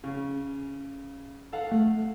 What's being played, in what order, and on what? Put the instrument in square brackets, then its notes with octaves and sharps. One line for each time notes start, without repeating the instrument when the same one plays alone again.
[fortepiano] C#3
A4 F5 F#5
[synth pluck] A3